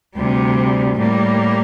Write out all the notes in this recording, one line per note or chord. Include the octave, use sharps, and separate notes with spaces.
D2 C3 G3
A2 G3 A#3